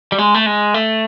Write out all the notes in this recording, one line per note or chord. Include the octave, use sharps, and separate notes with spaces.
G3
G#3
A3
G#3
A3